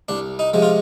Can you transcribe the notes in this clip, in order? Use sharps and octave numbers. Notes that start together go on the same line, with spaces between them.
C2 D4
D#4
C3 F3 G#3
F4